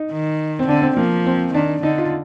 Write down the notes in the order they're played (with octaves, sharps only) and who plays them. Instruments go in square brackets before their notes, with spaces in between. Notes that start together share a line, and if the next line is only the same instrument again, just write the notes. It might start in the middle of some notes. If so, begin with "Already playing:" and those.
Already playing: [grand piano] D#4
[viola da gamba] D#3
[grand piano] C4
[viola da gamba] D3 [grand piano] D4
[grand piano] C4
[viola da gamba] F3 [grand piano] A#3
[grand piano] C4
[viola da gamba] D#3 [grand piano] D4
[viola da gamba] D3 [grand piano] D#4
[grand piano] F4